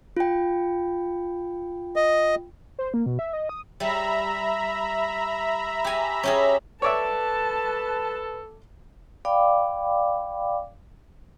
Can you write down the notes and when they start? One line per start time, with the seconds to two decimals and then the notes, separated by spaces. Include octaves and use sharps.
0.17 F4 G5
1.96 D#5
2.79 C5
2.94 A#3
3.06 B2
3.19 E5
3.33 D#5
3.49 D#6
3.80 G3 E5 A#5 B5
5.85 G4 G#5
6.23 C#4 G4 G#4
6.82 A4 B4 C#5 D5 E5 A5
9.25 D5 F5 G5 B5 D6